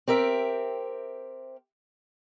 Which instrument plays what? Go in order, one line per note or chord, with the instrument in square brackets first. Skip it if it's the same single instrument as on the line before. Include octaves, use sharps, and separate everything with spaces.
[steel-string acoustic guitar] C4 G4 A#4 E5